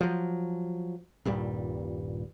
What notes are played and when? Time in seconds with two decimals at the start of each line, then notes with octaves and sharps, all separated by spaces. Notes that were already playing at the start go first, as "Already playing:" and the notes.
0.01 F3 F#3
1.25 D#1 G2 A#2 G3